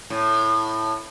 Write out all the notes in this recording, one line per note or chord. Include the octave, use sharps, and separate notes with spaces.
A2